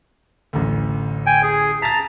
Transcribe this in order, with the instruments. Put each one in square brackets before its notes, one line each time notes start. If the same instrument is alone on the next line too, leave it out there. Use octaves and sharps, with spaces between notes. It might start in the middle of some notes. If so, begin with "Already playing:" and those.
[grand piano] A1 D2
[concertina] G5 G#5
G#4
[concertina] A5 A#5 [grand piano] A6 B6